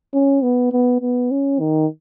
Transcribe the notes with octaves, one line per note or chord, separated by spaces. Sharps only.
C#4
B3
B3
B3
C#4
D#3